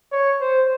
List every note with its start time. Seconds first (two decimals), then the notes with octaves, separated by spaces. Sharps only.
0.12 C#5
0.41 C5